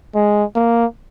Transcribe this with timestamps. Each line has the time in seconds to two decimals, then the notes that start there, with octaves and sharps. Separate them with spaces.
0.15 G#3
0.56 A#3